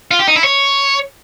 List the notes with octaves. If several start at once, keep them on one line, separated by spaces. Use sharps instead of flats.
F4
G4
D#4
E4
C#5